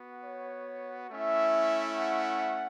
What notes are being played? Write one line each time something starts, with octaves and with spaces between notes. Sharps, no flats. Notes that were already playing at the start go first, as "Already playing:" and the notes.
Already playing: B3 F#4
C#5
A3 C#4 E4 E5
F#5